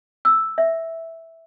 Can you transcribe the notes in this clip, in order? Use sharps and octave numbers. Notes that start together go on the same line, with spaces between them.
E6
E5